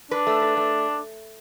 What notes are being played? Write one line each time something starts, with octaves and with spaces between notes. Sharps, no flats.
D4 B4
A3
B4
A3